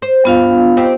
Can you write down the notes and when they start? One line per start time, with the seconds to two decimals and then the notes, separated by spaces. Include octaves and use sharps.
0.02 C5
0.25 G2 B3 F4 F5
0.77 C4 D#4 G4